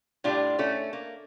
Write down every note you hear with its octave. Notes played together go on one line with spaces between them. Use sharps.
A2 G3 D4 F4
A3 C#4
A#3